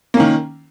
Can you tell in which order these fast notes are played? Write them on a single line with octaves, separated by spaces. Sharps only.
A#3 C#4 D#3